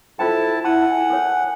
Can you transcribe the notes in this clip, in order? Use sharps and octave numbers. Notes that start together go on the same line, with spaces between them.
E4 F4 A4 C5 G5 A5
E4 F#5 A5
G#5
A4 A#4 C#5